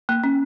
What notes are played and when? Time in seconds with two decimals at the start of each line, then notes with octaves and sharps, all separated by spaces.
0.09 A#3
0.24 C#4